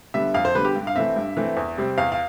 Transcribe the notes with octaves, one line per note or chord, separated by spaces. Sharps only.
D3 G3 B3 E5
F2 F5
C5
D3 G3 B3 B4
G4
G2
F5
E3 A3 C4 E5
G2
E3 A3 C4
E2
C3 G3 C4
E2 F5
F5